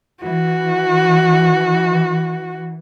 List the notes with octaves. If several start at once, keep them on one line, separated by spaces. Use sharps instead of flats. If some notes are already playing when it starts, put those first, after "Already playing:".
E3 F#4